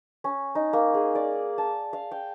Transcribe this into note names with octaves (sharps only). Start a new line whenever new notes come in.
C#4
D#4
A#3
G#4
D5
A5
F5
G5